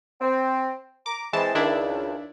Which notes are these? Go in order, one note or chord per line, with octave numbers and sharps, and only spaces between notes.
C4
A#5 D6
E3 G#3 C4 A5
C#2 D#3 D4 E4